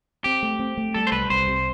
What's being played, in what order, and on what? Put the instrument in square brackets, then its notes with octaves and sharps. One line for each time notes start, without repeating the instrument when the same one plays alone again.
[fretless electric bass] C4 [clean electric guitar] G4
[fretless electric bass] A3
C4
A3
[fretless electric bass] G3 [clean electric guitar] A4
[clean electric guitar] C5
[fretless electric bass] C2 [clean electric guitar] B4
[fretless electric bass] C2 [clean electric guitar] C5
[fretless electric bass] C3